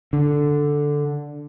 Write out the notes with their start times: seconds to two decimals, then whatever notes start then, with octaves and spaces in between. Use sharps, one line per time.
0.13 D3